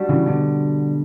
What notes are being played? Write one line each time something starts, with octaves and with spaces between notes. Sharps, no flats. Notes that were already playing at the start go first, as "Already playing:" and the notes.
Already playing: G3 D4 F#4
C#3 E3
B2 D3